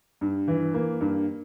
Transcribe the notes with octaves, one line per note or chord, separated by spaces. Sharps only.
G2
E3
A#3
G2